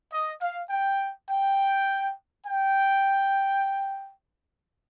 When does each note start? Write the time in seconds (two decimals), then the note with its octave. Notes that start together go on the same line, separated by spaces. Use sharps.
0.13 D#5
0.41 F5
0.70 G5
1.30 G5
2.47 G5